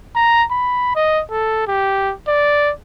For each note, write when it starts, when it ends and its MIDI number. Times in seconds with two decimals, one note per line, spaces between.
0.16 0.44 82
0.51 0.92 83
0.95 1.21 75
1.31 1.66 69
1.67 2.14 67
2.28 2.71 74